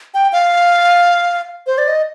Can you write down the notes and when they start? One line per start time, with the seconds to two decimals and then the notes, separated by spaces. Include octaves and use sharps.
0.14 G5
0.32 F5
1.67 C5
1.78 D5
1.88 D#5